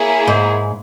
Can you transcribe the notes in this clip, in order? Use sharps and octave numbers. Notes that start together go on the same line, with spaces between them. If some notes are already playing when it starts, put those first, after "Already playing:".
Already playing: A#3 E4 G#4 C#5
G#2